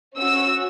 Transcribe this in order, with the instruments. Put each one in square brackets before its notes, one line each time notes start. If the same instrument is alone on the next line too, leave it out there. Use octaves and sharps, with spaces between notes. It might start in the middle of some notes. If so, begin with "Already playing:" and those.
[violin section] C#4 F#4 E6